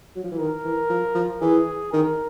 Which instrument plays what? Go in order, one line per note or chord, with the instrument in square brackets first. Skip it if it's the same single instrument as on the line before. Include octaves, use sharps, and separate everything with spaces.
[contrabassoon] F#3
F3
E3
[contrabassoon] D#3 [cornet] A#4
[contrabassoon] E3
F3
F3
[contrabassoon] E3 [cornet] G#4
[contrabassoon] D#3 [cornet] A#4